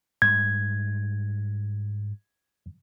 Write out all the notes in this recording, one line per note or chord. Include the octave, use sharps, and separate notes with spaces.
G#2 G3 G#6